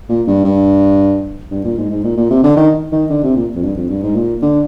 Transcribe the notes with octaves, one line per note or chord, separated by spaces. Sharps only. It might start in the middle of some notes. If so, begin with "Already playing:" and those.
A#2
G2
G2
G2
A#2
G#2
G#2
A#2
A#2
C3
D3
D#3
D#3
D3
C3
A#2
F2
G2
F2
G2
G#2
A#2
D3